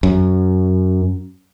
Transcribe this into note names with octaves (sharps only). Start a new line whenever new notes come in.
F#2